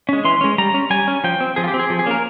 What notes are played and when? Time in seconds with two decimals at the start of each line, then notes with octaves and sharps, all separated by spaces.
0.09 G#3 C#4
0.25 E3 C6
0.41 G#3 C#4
0.58 G3 A#5
0.74 C#4
0.90 G3 G#5
1.08 C#4
1.24 F3 G5
1.41 C4
1.56 F3 G#4
1.64 F4
1.68 G4
1.74 C4
1.79 G#4
1.90 F3
1.99 G#4
2.06 A#3 C#4 A#4